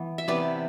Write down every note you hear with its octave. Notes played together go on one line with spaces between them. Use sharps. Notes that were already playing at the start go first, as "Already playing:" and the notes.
Already playing: E3 B3
E5
C3 E3 B3 B4 D5